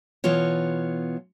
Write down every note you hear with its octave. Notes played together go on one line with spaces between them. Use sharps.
B2 E3 B3 F4 C#5